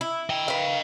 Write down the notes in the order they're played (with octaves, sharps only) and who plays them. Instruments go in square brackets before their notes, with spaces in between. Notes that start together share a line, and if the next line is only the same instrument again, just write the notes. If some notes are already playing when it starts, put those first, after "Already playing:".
[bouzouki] E4
[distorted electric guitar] D#5 G5
[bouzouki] B4 F5